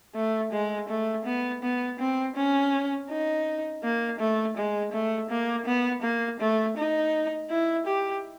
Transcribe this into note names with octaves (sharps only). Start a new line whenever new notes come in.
A3
G#3
A3
B3
B3
C4
C#4
D#4
A#3
A3
G#3
A3
A#3
B3
A#3
A3
D#4
E4
G4